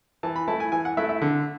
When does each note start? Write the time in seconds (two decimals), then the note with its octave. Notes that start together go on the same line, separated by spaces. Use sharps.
0.23 E3 A5
0.36 B5
0.48 A3 E4 A5
0.60 G#5
0.72 E3 G#5
0.85 F#5
0.97 A3 E4 E5
1.09 E5
1.21 D3